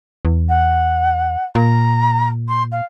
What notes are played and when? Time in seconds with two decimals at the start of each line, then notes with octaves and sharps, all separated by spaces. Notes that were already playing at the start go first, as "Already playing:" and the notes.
0.25 E2
0.49 F#5
1.55 A#2 A#5
2.48 C6
2.72 F5